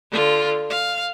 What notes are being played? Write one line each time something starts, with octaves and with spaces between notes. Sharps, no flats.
D3 F4
F5